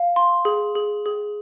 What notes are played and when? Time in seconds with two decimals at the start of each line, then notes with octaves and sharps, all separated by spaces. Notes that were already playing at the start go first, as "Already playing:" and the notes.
Already playing: F5
0.16 C6
0.45 G#4
0.75 G#4
1.06 G#4